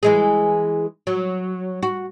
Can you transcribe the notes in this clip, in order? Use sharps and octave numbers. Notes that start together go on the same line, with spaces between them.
E3 G#3 G#4
F#3
F#4